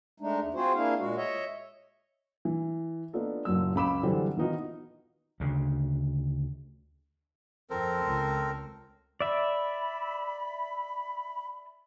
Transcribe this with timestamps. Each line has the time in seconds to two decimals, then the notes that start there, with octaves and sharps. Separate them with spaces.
0.20 G#3 A3 D4 D#4
0.41 D#2
0.54 C4 F4 F#4 G#4 C5
0.75 A#3 D4 E4 G#4 F5
0.99 A#2 G#3 F#4
1.16 C#5 D#5 E5
2.45 E3
3.13 B3 D4 D#4 F4 A4
3.45 F#1 A#2 F#3 E6
3.75 C#2 F#2 B5 D6 E7
4.03 D3 E3 F#3 G3 C4 D4
4.37 D#3 E3 B3 D#4 F4 F#4
5.40 D2 C#3
7.70 F2 C4 A4 A#4 C5
8.05 C#2
9.21 D5 E5 B5